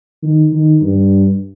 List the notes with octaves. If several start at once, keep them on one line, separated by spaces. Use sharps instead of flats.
D#3
D#3
G2